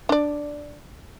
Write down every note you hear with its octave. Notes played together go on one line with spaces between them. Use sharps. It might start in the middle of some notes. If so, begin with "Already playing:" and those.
D4 D5